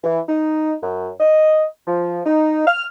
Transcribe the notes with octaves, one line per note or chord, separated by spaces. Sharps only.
E3
D#4
F#2
D#5
F3
D#4
F6